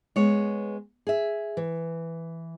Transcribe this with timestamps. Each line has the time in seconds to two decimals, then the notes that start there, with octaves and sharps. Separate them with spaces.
0.16 G#3 B3 C#5
1.07 G#4 E5
1.57 E3